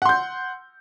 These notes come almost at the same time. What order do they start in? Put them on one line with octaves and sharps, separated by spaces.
F#5 C6 G6